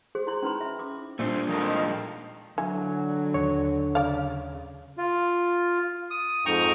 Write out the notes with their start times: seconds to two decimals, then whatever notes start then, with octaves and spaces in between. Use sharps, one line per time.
0.15 F#4 G#4 C5
0.27 E4 C6
0.43 C#4 D#4 B4 B5 C6
0.61 E5
0.79 D6
1.19 A#2 G3 A3 D4 C5
1.48 F2 D#3 F3 G#3 A#4
2.58 D3 E3 F#3 G#5
3.34 D#2 C#5
3.95 C#3 D5 F5
4.98 F4
6.11 D#6
6.46 F2 G#2 G5 A#5 C#6 D#6